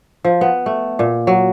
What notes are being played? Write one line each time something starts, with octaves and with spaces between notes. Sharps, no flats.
F3
B3
A3
A#2
F#3